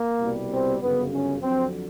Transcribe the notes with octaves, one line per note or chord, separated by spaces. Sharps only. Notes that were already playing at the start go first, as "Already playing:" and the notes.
Already playing: A#3
C2 B2 G3
C4
G1 F#2 C#3 B3
C#4
F2 D3 F#3 C4